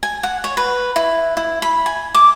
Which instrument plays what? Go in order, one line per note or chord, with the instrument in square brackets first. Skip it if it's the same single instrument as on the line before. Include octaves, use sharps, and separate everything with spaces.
[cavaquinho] G#5
F#5
C#5
B4
E4
E4
B5
G#5
D6